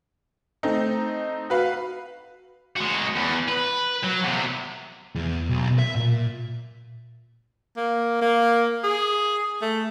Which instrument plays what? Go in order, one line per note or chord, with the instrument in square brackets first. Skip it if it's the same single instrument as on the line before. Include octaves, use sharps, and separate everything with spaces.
[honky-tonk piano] A3 C4 D#4
F#4 B4 F5
[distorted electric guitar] G#3 F#4
E2
B4
F#3
E2 C3
E2
B1
E5
A#2
[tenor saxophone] A#3
A#3
G#4
A3